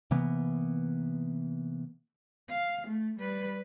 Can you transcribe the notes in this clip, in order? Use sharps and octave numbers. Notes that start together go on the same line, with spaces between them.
C3 E3 A#3 B3
F5
A3
G3 B4